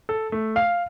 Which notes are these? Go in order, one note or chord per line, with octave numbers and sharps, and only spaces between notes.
A4
A3
F5